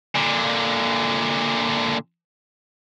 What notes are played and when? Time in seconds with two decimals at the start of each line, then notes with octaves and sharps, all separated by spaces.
0.15 A#2 D3